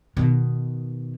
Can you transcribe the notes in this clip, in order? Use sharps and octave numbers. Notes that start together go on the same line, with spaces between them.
B2 D#3